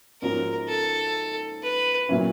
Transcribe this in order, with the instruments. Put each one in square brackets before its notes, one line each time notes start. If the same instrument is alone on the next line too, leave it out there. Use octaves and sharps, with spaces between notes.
[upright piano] G#2 F3 A#3 C#4 F#4 [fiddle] A#4
[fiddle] A4
B4
[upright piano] A#2 F#3 A#3 C#4 E4